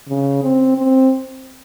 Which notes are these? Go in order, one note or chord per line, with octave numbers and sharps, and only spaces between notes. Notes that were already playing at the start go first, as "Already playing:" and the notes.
C#3
C4
C4